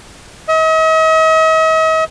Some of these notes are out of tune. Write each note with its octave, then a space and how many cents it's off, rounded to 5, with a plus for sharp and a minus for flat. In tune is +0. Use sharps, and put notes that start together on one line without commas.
D#5 +45